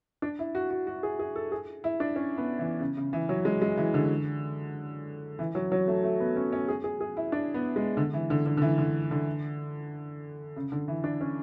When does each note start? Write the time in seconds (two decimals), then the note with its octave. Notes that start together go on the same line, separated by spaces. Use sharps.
0.22 D4
0.39 E4
0.55 F#4
0.71 F#4
0.87 F#4
1.03 G#4
1.19 G#4
1.36 A4
1.52 G#4
1.84 E4
2.00 D4
2.16 C#4
2.38 B3
2.59 E3
2.80 C#3
2.97 C#3
3.13 E3
3.29 F#3
3.45 G#3
3.62 G#3
3.77 E3
3.94 D3
5.39 E3
5.55 F#3
5.72 F#3
5.88 A3
6.04 A3
6.20 B3
6.36 C#4
6.53 C#4
6.68 G#4
6.84 G#4
7.01 G#4
7.17 E4
7.32 D4
7.54 B3
7.76 G#3
7.97 D3
8.13 E3
8.30 D3
8.46 D3
8.57 D3
8.62 E3
8.78 D3
9.11 D3
10.56 C#3
10.72 D3
10.88 E3
11.04 D4
11.21 C#4